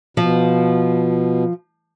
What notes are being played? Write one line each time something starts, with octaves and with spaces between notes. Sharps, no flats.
B2 F3